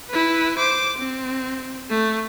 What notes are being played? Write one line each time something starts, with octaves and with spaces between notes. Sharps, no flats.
E4 B4
C5 D6
C4
A3